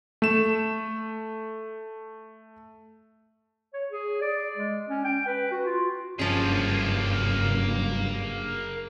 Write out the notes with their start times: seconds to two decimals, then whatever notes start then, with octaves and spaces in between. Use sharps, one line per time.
0.22 A3 E7
3.73 C#5
3.91 G#4
4.22 D5
4.56 G#3
4.89 C#4
5.04 G5
5.27 B4
5.51 F#4
5.65 F4
6.19 F#1 G2 F3 A#3 C#4 G#4